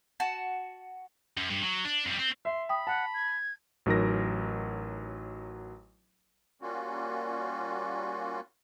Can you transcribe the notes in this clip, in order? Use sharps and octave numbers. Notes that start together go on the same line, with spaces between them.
F#4 A5
F#2
G2
F#3
D4
F2 G3
C4
E5 C6
G5 B5 D#6
F#5 A5
G#6
A1 F#3 D#4 A#4 A#6
G3 A#3 C#4 F4 F#4